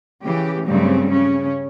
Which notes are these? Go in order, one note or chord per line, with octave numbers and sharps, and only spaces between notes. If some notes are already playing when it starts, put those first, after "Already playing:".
C#3 E3 G4
G2 C#3 F#3 G3 A3 C4
C#3 C#4